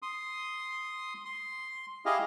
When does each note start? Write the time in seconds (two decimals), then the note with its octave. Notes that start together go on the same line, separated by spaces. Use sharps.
0.02 C6 D#6
1.25 C6
2.05 E4 G4 G#4 D#5 F5